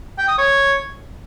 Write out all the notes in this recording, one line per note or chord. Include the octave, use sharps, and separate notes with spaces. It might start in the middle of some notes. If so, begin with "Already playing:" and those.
G5
D#6
C#5